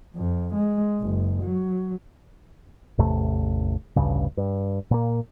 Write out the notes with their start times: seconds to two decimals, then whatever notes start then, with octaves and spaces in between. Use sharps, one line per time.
0.16 F2
0.54 G#3
1.00 F#1
1.43 F#3
2.98 A1 E2 C3 A3
3.96 A1 D2 G2 C#3
4.37 G2
4.91 A#2 A#3